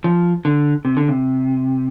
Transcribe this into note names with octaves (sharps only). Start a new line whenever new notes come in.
F3
D3
C3
D3
C3